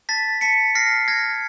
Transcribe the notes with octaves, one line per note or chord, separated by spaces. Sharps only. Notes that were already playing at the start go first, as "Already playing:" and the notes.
A5 A6 B6
A5 B6 C#7
F6 A#6 C7
F6 G#6 A#6